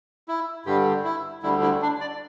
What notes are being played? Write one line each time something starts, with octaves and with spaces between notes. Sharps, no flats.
E4
G2 D3 G3 G4
E4
D2 D3 G3 E4
E4
D4
D5